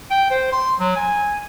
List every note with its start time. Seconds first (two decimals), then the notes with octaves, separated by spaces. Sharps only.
0.11 G5
0.30 C5
0.52 C6
0.79 F#3
0.96 G#5